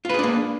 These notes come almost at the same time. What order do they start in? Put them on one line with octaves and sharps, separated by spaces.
F4 B4 G#4 D4 A#3